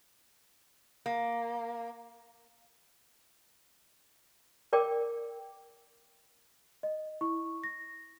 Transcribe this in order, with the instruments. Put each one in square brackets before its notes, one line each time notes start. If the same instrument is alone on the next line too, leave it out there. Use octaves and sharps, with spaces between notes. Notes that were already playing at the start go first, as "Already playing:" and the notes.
[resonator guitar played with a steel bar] A#3
[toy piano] A#4 D5 G5 D6
[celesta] D#5
E4 C#6
A#6